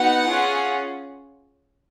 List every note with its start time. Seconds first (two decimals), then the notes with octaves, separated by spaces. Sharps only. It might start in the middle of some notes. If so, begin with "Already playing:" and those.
Already playing: B3 D#4 F#4 F#5
0.27 C#4 F4 G#4